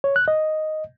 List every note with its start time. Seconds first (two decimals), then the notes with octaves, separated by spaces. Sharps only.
0.04 C#5
0.16 F#6
0.28 D#5